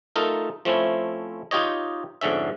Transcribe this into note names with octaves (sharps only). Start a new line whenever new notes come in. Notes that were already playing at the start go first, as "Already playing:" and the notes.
A3 D#4 F4 A4 A#4
F3 A3 C4 C#4 E4
D#4 F4 G4 C#5 D#5
F2 G#2 D3 C#4 E5